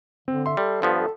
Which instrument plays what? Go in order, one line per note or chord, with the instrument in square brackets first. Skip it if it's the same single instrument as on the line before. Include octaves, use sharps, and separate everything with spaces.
[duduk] D3 [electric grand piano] C4
[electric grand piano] E5 C6
[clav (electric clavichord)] G3 [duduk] A4
[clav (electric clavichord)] G2 F3 B3
[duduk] A4